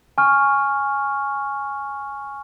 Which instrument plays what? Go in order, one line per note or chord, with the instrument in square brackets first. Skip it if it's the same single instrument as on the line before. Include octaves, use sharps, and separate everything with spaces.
[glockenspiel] G#5 C#6 F6